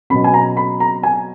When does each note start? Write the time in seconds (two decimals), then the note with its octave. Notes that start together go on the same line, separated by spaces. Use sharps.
0.10 B2 F#3 C#4 B5
0.24 G#5
0.34 A#5
0.57 B5
0.80 A#5
1.03 G#5